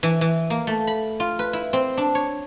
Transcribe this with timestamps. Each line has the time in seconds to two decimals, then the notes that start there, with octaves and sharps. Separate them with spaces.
0.03 E3
0.21 E3
0.50 A#3
0.67 A3
0.87 B5
1.20 F4
1.39 B4
1.53 E4
1.73 C4
1.97 D4
2.15 C#5